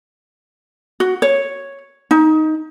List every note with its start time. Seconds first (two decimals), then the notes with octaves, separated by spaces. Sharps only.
1.00 F#4
1.22 C#5
2.11 D#4